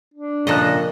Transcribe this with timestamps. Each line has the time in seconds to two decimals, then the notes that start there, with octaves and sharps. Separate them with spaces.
0.14 D4
0.47 A#2 C#3 F3 A4 D#5 A#5 F#6